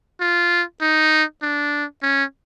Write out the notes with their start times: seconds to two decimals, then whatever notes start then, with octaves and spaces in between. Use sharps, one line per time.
0.20 F4
0.81 D#4
1.42 D4
2.03 C#4